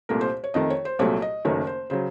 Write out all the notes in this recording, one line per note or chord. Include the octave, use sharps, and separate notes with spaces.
C2 A#2 A3 A#4
C5
C#5
F2 D#3 A3 D#5
C#5
C5
C2 A#2 F#3 A3 C#5
D#5
F#1 F#2 D#3 A3 C#5
C5
C#3 F#3 C5